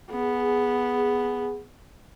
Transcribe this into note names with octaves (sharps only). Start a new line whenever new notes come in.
B3 G#4